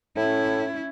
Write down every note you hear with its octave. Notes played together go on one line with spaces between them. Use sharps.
A2 C#4 E4